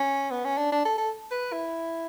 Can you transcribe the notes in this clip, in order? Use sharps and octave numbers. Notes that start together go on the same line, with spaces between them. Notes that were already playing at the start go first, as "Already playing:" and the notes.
Already playing: C#4
B3
C#4
D4
D4
A4
A4
B4
E4